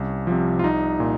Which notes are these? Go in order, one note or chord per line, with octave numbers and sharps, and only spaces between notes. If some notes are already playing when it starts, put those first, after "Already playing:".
Already playing: C2 C#4
C3 F3
F4
C2 D#4
A#2